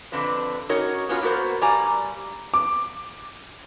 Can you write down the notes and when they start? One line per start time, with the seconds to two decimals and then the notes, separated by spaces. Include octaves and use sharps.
0.12 F2 D3 C4 D4 B4
0.69 C#4 D#4 F#4 A#4 C#5
1.09 B3 C#4 F4 F#4 B4
1.22 A#3 B3 F#4 A#4 C5
1.61 G2 G3 D5 G#5 A#5
2.54 D6